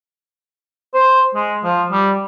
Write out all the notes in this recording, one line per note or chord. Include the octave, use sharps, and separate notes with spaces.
C5
G#3
F3
G3